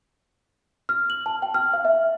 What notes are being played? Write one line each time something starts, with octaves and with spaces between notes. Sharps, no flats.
F6
F#7
A5
G5
F6
F5
E5